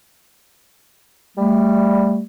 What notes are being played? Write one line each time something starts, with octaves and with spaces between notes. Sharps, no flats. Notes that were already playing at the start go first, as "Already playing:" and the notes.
G3 A3